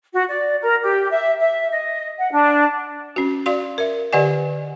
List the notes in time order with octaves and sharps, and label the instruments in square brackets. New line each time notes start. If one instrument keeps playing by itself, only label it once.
[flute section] F#4
D5
A#4
G4
E5
E5
D#5
F#5
D4
[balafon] C#4 F#4
F#4 D5 F5 C6
A#4 E5
D3 G4 D5 D#5 F#5 G#5